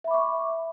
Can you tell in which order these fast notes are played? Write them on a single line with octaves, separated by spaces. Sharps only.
E5 B5 D6 C#6